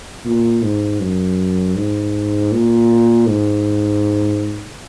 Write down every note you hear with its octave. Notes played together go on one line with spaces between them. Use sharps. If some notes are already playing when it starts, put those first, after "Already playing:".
A#2
G#2
F#2
G#2
A#2
G#2